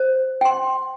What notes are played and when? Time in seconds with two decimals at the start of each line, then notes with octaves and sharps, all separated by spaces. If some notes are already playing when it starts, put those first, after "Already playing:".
Already playing: C5
0.41 G5 C6